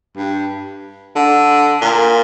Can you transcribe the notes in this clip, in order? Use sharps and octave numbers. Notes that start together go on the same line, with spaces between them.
G2
D3
A#2